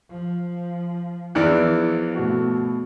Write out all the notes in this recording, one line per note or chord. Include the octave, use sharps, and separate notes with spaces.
F3
E2 E3 F3 D5 C#7 D7
B2 A3 F#4